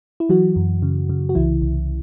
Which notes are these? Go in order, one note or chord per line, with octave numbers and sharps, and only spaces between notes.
E4
E3 F#3 F#4
F#2
C#3
C#3
F#4
C2 E3 E4
C2